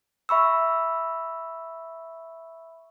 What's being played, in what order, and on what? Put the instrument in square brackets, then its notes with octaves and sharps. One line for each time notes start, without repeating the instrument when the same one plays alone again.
[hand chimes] E5 B5 C#6 E6